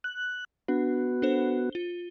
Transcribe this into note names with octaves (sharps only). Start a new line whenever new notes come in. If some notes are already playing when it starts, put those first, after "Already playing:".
F#6
B3 D4 F#4
D4 A4 C5
F4 G7